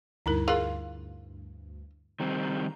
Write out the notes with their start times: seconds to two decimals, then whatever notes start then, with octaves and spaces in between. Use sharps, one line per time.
0.26 D2 G2 D#4 E4 A#4
0.48 F4 G#4 A#4
2.20 D#3 G3 C4 A#5